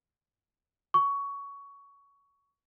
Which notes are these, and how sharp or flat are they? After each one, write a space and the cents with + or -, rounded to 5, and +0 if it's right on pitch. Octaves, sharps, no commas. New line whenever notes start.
C#6 +15